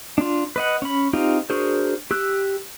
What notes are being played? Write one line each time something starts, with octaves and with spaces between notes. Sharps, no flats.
D4 F4
B4 D#5 F#5
C#4 B5
C4 D#4 F4 G4
D4 F#4 G#4 A#4 C5
G4 E6 F#6